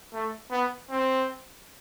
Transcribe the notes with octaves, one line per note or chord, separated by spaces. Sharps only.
A3
B3
C4